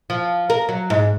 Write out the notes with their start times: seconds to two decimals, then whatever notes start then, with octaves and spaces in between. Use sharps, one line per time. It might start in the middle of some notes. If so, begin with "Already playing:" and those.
0.10 F3
0.50 A#4
0.69 F#3
0.90 G#2